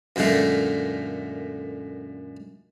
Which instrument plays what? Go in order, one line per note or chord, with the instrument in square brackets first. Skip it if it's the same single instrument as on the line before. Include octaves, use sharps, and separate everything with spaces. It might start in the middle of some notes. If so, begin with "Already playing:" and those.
[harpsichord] F#2 A#2 D3 G#3 A3